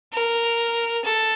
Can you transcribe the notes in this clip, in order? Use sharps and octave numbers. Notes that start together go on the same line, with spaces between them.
A#4
A4